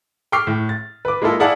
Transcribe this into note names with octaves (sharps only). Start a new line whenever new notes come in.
G5 C#6 D6 F6 C7
A2
A6
B4 D6
G#3 A#3 E4 F4 A4
E4 G#4 D5 F5 F#5 A5